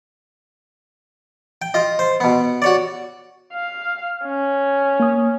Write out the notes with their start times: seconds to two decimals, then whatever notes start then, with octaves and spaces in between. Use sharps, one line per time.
1.62 G5
1.74 F4 D#5
1.99 C5
2.20 B2 B3
2.62 F#4 C#5 D5
3.53 F5
4.24 C#4
5.00 A#3 D#6